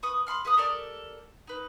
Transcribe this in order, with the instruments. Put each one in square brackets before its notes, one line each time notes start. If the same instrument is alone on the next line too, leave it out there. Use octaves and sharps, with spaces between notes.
[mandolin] B4 C#6 D#6
F5 B5 C6 F6
G#4 B4 F5 D#6
G4 A4 A#4 D5
D#4 B4